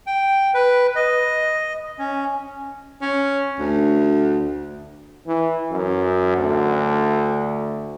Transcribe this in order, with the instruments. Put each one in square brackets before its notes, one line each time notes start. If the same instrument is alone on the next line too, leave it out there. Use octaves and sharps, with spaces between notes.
[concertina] G5
B4
D#5
C#4
[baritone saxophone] C#4
D2
[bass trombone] E3
F#2
D2